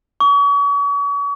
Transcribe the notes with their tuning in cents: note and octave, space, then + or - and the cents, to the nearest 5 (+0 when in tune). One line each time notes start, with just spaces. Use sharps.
C#6 +40